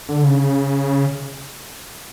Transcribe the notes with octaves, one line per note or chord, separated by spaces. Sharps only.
D3
C#3